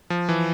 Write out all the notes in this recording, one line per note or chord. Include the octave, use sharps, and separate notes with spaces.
F3
E3